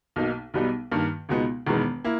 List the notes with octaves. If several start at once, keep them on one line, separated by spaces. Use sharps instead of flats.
B1 B2 A#3 D#4
B1 B2 G3 B3 D#4
G2 D#3 A#3
C#2 B2 G#3 B3 D#4
E1 E2 D#3 G#3 B3
A#3 E4